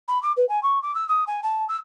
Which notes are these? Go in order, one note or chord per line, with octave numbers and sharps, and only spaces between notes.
B5
D6
B4
G#5
C#6
D6
E6
D#6
G#5
A5
E6